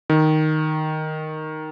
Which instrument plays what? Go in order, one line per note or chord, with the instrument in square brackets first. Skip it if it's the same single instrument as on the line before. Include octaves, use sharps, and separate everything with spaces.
[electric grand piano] D#3